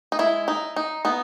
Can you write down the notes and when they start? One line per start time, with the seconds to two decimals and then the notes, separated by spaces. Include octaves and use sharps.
0.12 D#4
0.19 G#3 E4
0.48 D#4
0.76 D#4
1.05 B3 D#4